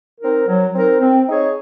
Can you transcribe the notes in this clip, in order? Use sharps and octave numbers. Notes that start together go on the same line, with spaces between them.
C4 D#4 A#4
F#3
C4 D#4 A#4
C4
D#4 G#4 C#5